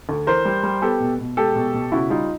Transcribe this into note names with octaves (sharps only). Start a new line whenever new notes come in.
D2
E3 A#4 C5
G3
G3
B3 G4 A4
B2
B2
G#3 G4 A4
B2
B2
C#3 E4 F#4
G3 D#4 F4